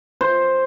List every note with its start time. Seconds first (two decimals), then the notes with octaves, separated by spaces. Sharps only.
0.21 C5